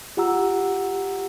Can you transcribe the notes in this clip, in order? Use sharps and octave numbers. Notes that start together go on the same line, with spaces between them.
F4 G4 F#5 A#5 E6